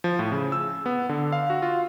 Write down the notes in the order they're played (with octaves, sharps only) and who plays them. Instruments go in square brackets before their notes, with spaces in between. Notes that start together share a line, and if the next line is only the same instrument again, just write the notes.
[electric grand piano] F3
A2
C#3
E6
B3
D3
F5
F#4
F4